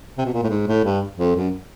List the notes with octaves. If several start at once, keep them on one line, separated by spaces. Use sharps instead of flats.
C3
B2
A#2
A2
G#2
A2
G2
F2
F#2